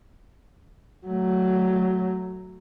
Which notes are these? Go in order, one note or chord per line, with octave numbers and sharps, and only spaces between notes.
F#3 A3